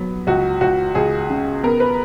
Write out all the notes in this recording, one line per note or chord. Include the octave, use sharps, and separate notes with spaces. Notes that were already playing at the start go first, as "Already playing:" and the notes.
Already playing: F#3 B3
C#2 F#4
C#2 F#4
C#2 G#4
C#3
B3 A#4
B4